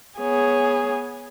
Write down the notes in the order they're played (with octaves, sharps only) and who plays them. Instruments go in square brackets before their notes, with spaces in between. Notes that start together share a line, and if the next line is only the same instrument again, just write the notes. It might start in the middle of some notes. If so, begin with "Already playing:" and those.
[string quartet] B3 G#4 C#5